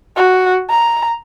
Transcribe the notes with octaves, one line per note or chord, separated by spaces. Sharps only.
F#4
A#5